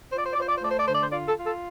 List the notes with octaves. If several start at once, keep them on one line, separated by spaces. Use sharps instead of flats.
F4 C5
D5
C5
F4 D5
C5
D5
C5
A3 D5
C5
D5
D3 C5
D5
C5
F4 D5
A4
F4
A4